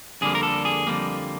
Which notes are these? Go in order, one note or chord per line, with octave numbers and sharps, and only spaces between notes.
F2 D3 G3 A#3 G#4
A#4
A4
G#4
F2 D3 G3 A#3